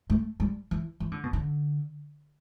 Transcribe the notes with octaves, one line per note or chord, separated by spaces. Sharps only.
A3
G3
E3
E3
D3
B2
D3